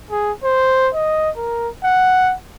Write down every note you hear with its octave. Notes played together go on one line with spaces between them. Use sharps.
G#4
C5
D#5
A#4
F#5